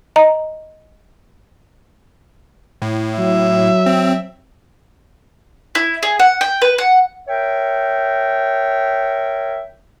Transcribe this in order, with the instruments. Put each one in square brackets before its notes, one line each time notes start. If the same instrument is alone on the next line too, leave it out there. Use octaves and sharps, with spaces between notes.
[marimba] D#5 A#5
[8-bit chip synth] A2
[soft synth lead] F#3 [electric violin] E5
[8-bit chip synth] C4
[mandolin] E4
G#4
F#5
G5
B4
F#5
[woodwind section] A#4 C#5 E5 G5